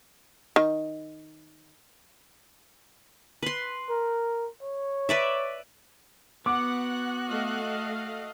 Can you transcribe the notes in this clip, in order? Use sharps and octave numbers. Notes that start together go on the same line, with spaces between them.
D#3
B4 C6
A#4
C#5
B4 D5 E5
B3 F#4 F#5 D6 F#6
A3 D#5 F5